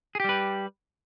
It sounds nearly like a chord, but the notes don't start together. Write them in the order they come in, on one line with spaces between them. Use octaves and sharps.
G#4 G4 G3 B4